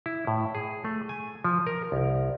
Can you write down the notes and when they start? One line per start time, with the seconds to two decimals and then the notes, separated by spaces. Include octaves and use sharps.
0.06 E4
0.27 A2
0.55 G#4
0.85 A3
1.09 G#5
1.44 F3
1.67 A#4
1.92 C2